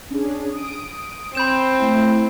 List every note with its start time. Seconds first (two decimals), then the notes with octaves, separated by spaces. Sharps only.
0.11 C#4 D4 G#4
0.52 D#6 D7
1.35 C4 B5 G6 E7
1.79 A3 E4